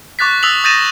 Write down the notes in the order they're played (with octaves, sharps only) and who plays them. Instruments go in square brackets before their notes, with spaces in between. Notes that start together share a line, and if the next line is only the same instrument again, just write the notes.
[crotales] C#6 D6 F#6 A6 B6
D#6 E6 A6 B6 F7 F#7
D#6 G6 A6 A#6 D#7 E7